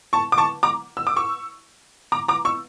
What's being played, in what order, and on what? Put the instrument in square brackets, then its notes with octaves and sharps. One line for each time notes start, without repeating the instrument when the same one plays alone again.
[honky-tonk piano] A5 C#6
D6
A5 C#6
A#5 D6
E6
D6
C#6 E6
A#5 D6
A#5 D6
C#6 E6